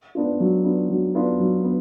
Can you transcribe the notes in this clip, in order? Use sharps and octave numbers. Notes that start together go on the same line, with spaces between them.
B3 D4 F4
F#3
B3 D4 F4
F#3
B3 D4 F4
F#3
B3